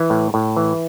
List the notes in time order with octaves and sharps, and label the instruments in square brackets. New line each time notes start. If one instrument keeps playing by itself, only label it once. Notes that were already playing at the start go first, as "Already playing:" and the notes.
Already playing: [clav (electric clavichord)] E3
A2
A2
E3